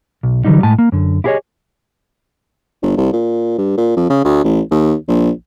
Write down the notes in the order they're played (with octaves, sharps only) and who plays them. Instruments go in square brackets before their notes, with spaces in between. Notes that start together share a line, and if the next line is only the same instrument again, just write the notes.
[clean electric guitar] B1
D3 E3 F#3 G3 D#4
A2 G#3 G#5 A5
A#3
F#2 D3
E4 G4 G#4 A#4 C#5 D#5
[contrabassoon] G1
C2
A#2
G2
A#2
F2
C#3
D2
A1
D#2
A#1